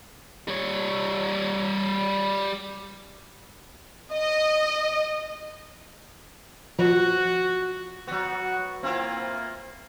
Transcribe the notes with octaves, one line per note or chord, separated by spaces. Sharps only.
G3 C#5
D#5
F3 F#4
F#3 B3 F#4
A#3 C4 E4 F4